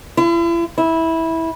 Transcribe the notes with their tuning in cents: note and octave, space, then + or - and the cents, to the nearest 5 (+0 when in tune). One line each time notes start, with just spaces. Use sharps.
E4 +40
E4 -15